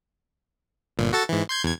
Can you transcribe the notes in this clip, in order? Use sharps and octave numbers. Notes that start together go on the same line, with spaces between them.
G1 A#2
F#4 A4 A6
G#2 E3
C6 G6 G#6
E2 G#6